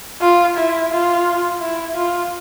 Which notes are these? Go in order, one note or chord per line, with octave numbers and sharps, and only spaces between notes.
F4
E4
F4
E4
F4